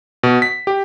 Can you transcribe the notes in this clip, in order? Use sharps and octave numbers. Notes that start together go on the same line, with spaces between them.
B2
B6
G4